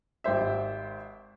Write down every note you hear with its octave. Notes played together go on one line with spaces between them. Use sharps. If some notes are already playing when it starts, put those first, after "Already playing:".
G#1 G4 C5 E5